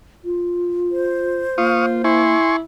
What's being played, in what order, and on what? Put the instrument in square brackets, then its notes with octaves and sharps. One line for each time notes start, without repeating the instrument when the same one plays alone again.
[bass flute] F4
[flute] C5
[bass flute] A#3 [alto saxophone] F4 [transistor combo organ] F5 C#6 D#6
[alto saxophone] E4 [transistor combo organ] G#5 C6 C#6